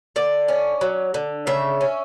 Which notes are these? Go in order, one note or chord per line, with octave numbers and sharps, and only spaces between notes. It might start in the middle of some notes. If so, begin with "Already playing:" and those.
D3 D5
C#4
F#3
D3
C#3 E5
C#4